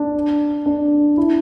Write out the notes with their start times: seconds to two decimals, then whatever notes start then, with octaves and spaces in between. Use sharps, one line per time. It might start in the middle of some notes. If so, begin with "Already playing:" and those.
Already playing: D4
0.66 D4
1.18 E4